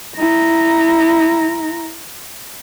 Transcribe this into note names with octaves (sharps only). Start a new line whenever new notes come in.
E4 A#5